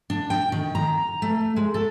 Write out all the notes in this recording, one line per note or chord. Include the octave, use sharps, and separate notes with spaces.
D4
G5
D#3
A#5
A3
G#3
A4